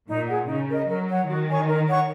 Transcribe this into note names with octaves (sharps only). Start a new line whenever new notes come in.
A#2 D#4
G#4 F#5
C#3 D#4
A#4 D#5
F#3 A#4
C#5 F#5
D#3 F#4
C#5 G#5 C#6
A#4
C#5 F#5 C#6